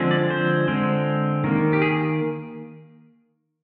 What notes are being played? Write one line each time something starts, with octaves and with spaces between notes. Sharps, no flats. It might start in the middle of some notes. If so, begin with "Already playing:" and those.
Already playing: D3 F3 G#3 C4
D5
C5
D3 G#3 C4
D#3 A#3
G4
G#4